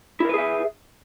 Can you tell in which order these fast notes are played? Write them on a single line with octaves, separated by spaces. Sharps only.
E4 A#4 B4 G#4 E5